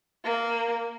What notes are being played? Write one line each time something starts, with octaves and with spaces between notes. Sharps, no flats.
A#3